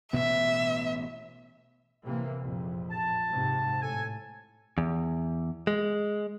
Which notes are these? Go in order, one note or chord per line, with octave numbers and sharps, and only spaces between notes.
A1 B2 B3 E5
C3 E3 A#3
A#1 F2
A5
G#2 C3
A2 A4 G#5
E2
G#3